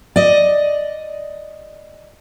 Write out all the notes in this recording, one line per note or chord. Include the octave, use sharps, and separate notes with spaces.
D5 D#5